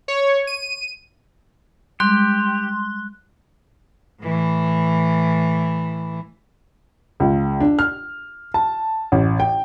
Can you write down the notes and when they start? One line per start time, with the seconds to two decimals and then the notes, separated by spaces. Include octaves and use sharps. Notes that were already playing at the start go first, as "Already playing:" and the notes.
0.08 C#5
0.47 D#7
2.00 G3 G#3 G4 C6 F#6
4.22 A2 E3
7.20 C#2
7.61 D4
7.79 F6
8.54 A5
9.12 A1
9.40 G5